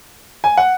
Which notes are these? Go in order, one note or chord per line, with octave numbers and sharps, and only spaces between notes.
G#5
F#5